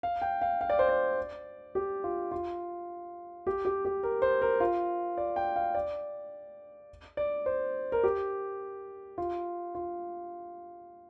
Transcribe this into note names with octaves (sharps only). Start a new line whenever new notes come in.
F5
G5
F5
F5
D5
C5
D5
G4
F4
F4
G4
G4
G4
A#4
C5
A#4
F4
D5
G5
F5
D5
D5
C5
A#4
G4
F4
F4